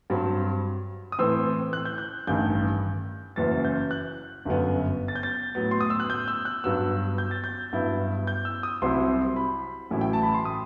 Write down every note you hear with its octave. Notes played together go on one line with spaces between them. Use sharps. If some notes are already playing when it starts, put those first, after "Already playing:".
G2 F#3 C4
D#6
A2 E3 A3 C4 E6
F#6
G6
F#6
A1 G2 D#3 G6
F#1 F#2 E3 A6
G6
F#6
G1 F#2 F#3 B3
A6
G6
A6
A2 F#3 B3
C6
D#6
E6
F#6
G6
E6
F#6
G2 F#3 B3 E6
G6
A6
G6
G2 F#3 B3 E4
G6
E6
D#6
C2 C3 F#3 C4 E4 C6
B5
A1 A2 F#3 A3 E4
G5
A5
B5
C6
D#6